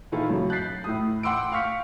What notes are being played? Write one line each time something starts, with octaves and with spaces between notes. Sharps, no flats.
A#2 D#3 E4 F4 A4
F#2 C#3
F#6 G6 A6 B6 C7
A2 A3 D#6
F#5 G5 C6 D6 E6 D7
F5 C#6 F6 B6 C#7